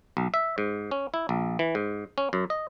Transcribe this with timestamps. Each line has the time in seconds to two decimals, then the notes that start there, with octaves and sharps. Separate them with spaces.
0.17 B1
0.34 E5
0.58 G#2
0.91 C#4
1.14 E4
1.29 A#1
1.59 E3
1.75 G#2
2.18 C#4
2.33 F#2
2.50 D#5